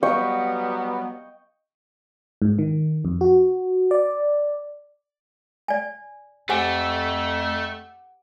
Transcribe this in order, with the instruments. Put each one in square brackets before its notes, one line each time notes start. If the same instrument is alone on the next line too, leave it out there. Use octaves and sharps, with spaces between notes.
[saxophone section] F#3 G3 B3 [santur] D#5 G5 C#6
[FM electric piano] G#2
D#3
F2
F#4
D5
[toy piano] D5 G#5
[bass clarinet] F2 [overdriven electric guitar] A3 [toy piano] G4 C5 G#5 [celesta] F#5 D6 D7